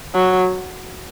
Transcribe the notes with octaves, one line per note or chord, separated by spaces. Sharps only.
F#3